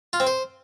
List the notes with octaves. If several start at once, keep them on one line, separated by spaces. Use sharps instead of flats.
F4
C4
C5